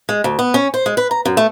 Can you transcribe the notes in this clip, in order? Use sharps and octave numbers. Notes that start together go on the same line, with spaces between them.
G#3
D2
B3
C#4
C5
G#3
B4
A#5
F#2
A3